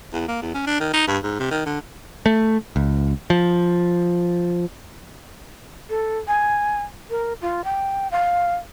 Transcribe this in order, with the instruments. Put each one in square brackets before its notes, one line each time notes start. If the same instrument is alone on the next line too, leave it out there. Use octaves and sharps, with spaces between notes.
[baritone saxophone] E2
A#3
E2
C#4
D4
D#3
D#4
G2
G#2
C3
D#3
D3
[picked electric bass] A3
C#2
F3
[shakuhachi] A4
G#5
A#4
F4
G5
F5